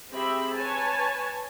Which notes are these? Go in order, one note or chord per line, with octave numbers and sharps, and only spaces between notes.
C4 G4 G#4 E5 B5
B4 C#5 G#5 A5